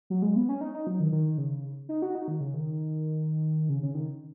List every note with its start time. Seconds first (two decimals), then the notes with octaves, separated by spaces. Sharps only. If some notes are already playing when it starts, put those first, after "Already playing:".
0.10 F#3
0.22 G#3
0.36 B3
0.49 C#4
0.61 D#4
0.74 D#4
0.87 F#3
1.00 D#3
1.12 D#3
1.38 C#3
1.89 D#4
2.02 F#4
2.15 D#4
2.28 D#3
2.40 C#3
2.54 D#3
3.69 C#3
3.82 C#3
3.95 D#3